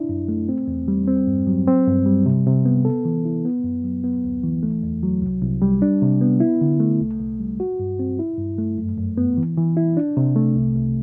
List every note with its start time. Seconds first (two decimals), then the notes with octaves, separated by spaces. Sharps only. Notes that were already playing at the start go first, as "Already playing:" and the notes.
Already playing: D4 E4
0.09 F#2
0.28 A3
0.49 C4
0.68 E2
0.88 G3
1.07 C4
1.27 G2
1.47 F#3
1.68 C4
1.87 G2
2.06 G3
2.26 C3
2.46 C3
2.65 B3
2.85 A4
3.05 E3
3.25 E4
3.45 B3
3.64 F#2
3.84 F#3
4.04 B3
4.24 D2
4.44 E3
4.63 A3
4.83 E2
5.03 F#3
5.22 C2
5.42 C2
5.62 G3
5.82 D4
6.02 C3
6.21 B3
6.40 E4
6.61 D3
6.80 A3
7.00 C2
7.20 C2
7.39 G3
7.60 F#4
7.79 G2
7.99 C4
8.19 E4
8.38 G2
8.59 A3
8.78 F#2
8.98 F#2
9.18 B3
9.37 E3
9.57 E3
9.77 E4
9.97 D4
10.17 C3
10.36 A3
10.56 C2
10.76 C2